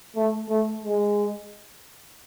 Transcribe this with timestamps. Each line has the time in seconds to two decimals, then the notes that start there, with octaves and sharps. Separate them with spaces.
0.16 A3
0.49 A3
0.83 G#3